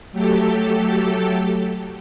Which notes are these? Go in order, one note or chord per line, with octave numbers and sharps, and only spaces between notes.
F#3 A3 G4 A4